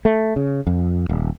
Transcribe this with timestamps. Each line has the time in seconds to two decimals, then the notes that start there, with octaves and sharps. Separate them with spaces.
0.05 A3
0.36 C#3
0.67 F2
1.09 D#1